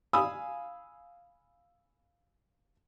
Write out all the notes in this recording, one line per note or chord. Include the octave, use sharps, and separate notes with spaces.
F5 G#5 B5 D#6 E6